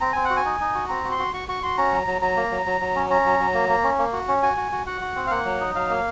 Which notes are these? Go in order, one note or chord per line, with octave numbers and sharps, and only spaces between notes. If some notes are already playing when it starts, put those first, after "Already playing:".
C4 A#5
C4 G#5
F#5
F#4
G#5
D#4
D#4
F#4
C4 A#5
F#4
C6
F#4
F#4 C#6
F#4 C#6
F#4 C6
C#4 A#5
F#3
F#3
F#3 A#5
A#3
F#3
F#3
F#3
C#4
C#4 A#5
F#3
F#3
A#3
A#3
C#4
A#3
F#4
C#4
F#4 G#5
F#4
F#4
F#4 F#5
F#4
C4
F5
A#3 F#5
F#3
D#4
F#3 F5
A#3